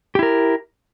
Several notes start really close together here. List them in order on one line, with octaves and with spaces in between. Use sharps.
G4 E4 A#4